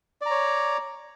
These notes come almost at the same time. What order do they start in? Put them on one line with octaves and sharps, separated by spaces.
D5 A#5 C#5